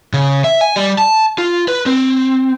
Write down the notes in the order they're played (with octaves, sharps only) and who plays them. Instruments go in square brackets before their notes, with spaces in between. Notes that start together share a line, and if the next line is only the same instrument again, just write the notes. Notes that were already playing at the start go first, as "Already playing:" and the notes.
[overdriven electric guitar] C#3
E5
G#5
G3
A5
F4
B4
C4